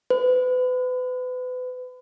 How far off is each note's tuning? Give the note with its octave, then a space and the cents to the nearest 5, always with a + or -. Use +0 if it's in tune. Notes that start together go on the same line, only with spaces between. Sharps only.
B4 +35